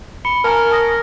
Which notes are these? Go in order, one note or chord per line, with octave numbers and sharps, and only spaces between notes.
B5 C#7 G7
C#4 A#4 A5 A#5 F6
A5 D#6 A#6